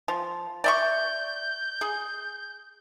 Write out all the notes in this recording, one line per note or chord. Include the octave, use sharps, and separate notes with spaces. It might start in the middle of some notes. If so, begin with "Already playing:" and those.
F3
D5 E5 C#6 G6
G#4